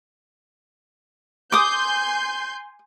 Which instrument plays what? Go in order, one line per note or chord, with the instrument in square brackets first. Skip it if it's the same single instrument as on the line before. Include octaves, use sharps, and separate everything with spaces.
[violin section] G#5 C6 G6 [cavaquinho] D6 D#6